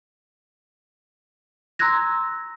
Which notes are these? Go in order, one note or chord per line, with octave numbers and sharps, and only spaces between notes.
A#5 C6 E6 F#6 G#6 A#6